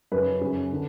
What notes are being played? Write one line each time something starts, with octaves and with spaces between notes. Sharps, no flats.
F#2 C#3 B4
F#2 C#3
D3